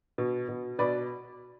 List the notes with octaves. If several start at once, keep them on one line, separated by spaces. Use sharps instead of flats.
B2
B2
B2 B4 D5